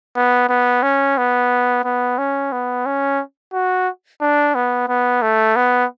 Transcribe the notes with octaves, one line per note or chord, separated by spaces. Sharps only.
B3
B3
C#4
B3
B3
C#4
B3
C#4
F#4
D4
B3
B3
A3
B3